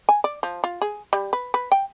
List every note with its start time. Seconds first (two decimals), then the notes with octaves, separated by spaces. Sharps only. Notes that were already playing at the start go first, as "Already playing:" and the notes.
0.09 G#5
0.24 D5
0.43 F3
0.64 F4
0.82 G#4
1.13 G3
1.33 B4
1.54 B4
1.72 G5